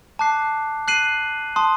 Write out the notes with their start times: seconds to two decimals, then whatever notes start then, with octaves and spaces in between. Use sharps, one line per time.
0.19 A5 D6 F#6 C7
0.88 F#6 C7 D#7 F#7
1.56 A5 C6 D#6